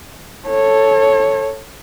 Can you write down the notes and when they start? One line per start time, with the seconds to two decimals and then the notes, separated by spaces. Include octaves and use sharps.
0.47 A4 C#5